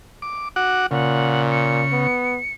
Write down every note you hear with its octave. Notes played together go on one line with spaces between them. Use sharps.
D6
F#4 F#5 D6
A#2 C#3 F#5
C#7
B3